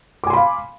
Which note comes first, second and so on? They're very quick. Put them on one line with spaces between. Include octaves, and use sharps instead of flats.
D6 G#5 C6 B5 F5